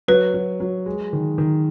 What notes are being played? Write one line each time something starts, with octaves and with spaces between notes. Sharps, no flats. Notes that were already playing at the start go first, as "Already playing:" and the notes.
F#3 B4
F#3
F#3
G#3
D#3
D#3